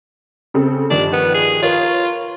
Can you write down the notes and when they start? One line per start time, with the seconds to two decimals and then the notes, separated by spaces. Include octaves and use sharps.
0.54 C#3 C4 A4
0.90 G2 D#3 F3 D4
1.12 B3
1.34 G#4
1.62 F4 A#4 B4 C#5